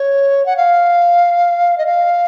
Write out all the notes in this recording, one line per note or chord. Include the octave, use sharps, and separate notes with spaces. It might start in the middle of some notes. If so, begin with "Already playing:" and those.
Already playing: C#5
F#5
F5
D#5
F5